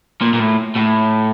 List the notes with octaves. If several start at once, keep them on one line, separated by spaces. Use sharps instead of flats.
A#2
A#2
A2
A2